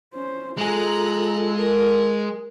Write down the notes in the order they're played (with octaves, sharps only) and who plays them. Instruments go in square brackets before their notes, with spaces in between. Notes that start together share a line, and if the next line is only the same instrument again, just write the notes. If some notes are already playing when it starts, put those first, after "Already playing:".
[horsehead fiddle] C#4 C5
[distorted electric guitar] G#3 G#4 [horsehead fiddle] F4 A4 [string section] A#5 F#6
[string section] A#4